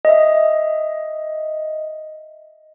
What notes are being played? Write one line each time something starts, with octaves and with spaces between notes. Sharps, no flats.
D#5 E5